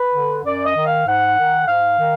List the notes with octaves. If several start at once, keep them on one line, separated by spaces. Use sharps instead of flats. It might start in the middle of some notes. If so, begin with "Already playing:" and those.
Already playing: B4
D3
F#2 D5
D#5
D#3
F5
G#2 F#5
D#3
G#2 F5
D#3